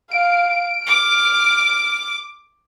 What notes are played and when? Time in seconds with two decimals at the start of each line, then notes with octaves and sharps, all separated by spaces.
0.11 F5 D7
0.87 D6 F6